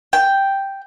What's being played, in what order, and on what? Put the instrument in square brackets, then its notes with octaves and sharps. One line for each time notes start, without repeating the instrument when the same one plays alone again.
[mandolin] G5